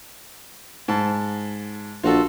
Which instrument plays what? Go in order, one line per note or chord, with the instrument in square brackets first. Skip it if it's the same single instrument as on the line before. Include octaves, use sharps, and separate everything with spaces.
[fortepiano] G#2 A5
[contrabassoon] A#1 [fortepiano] F4 F#4 A4